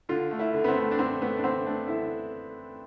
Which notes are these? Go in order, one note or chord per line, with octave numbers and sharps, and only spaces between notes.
D3 F4
A3
E4
D3
B3
C4
A3
D4
D3 C4
A3 B3
D4
D3 C4
A3 D4
D3 E4